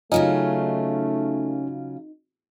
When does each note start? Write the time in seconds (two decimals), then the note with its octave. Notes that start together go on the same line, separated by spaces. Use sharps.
0.12 C#3 F#3 A3 C#4 D#4 F4